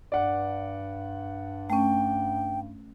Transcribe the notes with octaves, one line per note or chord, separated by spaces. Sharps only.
G2 D5 F#5
A3 C#4 G5